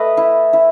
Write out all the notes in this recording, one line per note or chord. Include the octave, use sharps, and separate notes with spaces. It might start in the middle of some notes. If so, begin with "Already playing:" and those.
Already playing: A3 B4 D#5
E4
E4